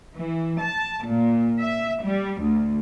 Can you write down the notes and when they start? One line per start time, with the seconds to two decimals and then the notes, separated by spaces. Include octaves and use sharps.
0.15 E3
0.59 A5
1.04 A#2
1.60 E5
2.03 G3
2.42 D2